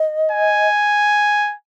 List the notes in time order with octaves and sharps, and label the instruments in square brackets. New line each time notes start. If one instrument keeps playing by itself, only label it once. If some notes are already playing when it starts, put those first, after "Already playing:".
Already playing: [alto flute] D#5
[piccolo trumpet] G#5